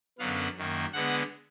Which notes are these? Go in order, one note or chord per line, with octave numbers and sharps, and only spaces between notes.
F#2 D3 F#3 B3 F5
F#2 D#3 A#3
D3 G#3 B3 F#5